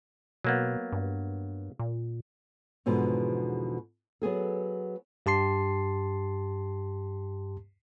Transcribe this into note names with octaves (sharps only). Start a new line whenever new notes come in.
B2 F#3 A#3 B3
G2
A#2
E2 G#2 B2 D3 F3
F#3 B3 G#4 A4
G2 G4 A5 C6 C7